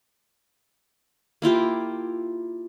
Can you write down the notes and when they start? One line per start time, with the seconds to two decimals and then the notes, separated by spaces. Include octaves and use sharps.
1.42 A#3 E4 F4 G4